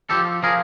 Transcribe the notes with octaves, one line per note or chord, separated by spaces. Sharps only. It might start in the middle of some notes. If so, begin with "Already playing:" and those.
F3 G4 A4
F3 G#4 A#4